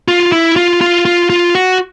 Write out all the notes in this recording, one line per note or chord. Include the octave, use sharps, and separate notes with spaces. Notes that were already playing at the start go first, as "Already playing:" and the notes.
F4
E4
F4
F4
F4
F4
F#4